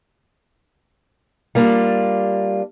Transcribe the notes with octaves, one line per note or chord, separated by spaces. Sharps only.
G3 A#3 D4 F4